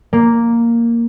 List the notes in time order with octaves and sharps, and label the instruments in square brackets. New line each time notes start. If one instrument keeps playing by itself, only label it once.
[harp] A#3